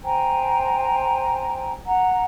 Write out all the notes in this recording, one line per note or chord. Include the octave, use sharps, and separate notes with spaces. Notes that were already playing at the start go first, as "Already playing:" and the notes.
C5 G5 G#5 A#5
F#5 A#5